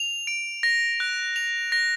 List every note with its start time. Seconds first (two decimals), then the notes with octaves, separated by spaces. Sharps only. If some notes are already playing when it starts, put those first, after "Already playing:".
Already playing: F7
0.27 D7
0.63 A#6
1.00 F#6
1.36 F7
1.72 A#6